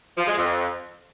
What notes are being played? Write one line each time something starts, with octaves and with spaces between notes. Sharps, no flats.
F3
G#3
F2